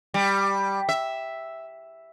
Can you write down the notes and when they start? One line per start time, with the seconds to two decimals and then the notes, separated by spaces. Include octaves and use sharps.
0.14 G3
0.89 E5